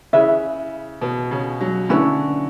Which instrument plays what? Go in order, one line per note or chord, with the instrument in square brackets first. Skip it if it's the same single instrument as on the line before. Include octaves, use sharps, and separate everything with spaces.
[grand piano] C#3 [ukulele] E4 G#4 B4 E5
[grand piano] B2
C#3
F#3
[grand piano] D3 [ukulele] C#4 E4 B4